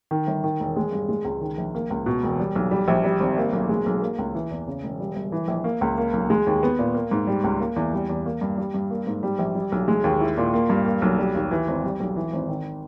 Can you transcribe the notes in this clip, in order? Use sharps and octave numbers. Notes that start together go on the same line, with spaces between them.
D#3
G1
D#3
E1
G#3
G2
G#3
C#2
D#3
A#1
A#3
C#2
B2
E1
G3
B1
G3
A#1
G3
G#1
A#3
B1
G#3
B1
A#3
C#2
E3
E2
C#3
E1
G3
G1
E3
A#1
A#3
C#2
A#3
B1
G#3
D#2
B3
A#2
A#3
G#2
G3
C#2
A#3
E2
G3
E2
A#3
G2
G3
G2
A#3
G#2
G3
A#1
G3
B1
G#3
D#2
E4
A#2
A#3
G2
A#3
B1
G3
D#2
E3
G#1
G3
B1
E3
G#1
D#3